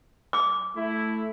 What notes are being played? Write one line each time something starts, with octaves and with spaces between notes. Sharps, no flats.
D6
A3 E4